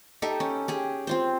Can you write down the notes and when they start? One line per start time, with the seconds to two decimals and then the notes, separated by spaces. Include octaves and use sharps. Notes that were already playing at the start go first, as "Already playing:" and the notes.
0.22 D#4 G4 A4 E5
0.40 C#4
0.68 G4 G#4
1.07 C4 F4 C5